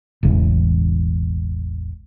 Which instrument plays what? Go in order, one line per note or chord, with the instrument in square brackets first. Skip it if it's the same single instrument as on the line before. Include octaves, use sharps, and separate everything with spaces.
[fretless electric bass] E1 A1 C#3 E3